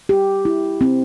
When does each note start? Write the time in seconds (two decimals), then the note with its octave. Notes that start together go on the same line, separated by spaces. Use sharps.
0.09 G4
0.45 E4
0.81 C4